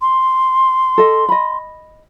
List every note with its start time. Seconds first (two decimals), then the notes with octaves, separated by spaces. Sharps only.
0.01 C6
0.98 A4 D#5
1.29 D#5 B5